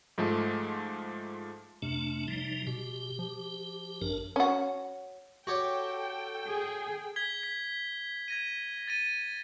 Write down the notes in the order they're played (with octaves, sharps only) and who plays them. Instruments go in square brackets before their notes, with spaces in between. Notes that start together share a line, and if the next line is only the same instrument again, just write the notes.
[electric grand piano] G#2 F3 G#3 A3
[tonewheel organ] F2 A3 D4 [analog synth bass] C3
[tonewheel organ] F3 G3 D#4
[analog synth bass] B2 [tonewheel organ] G4
[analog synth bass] F3
[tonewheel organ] A1 D4 A#4 [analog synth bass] F#2
[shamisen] C#4 F#4
[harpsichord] F#4 G4 C#5 [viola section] A4 G5
[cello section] G#4
[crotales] G#6 B6 G7
B6
G#6 A#6 D#7
A6 A#6 D#7